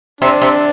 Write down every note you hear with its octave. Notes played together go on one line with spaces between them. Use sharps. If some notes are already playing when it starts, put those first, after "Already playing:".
C3 D4
C3